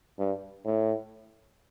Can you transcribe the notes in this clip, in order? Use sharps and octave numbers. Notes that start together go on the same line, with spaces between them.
G2
A2